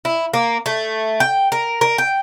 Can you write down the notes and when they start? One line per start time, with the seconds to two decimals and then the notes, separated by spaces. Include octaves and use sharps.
0.05 E4
0.34 A#3
0.66 A3
1.20 G5
1.52 A#4
1.81 A#4
1.98 G5